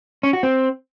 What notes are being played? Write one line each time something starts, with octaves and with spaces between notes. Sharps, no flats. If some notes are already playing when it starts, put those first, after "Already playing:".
C#4
F#4
C4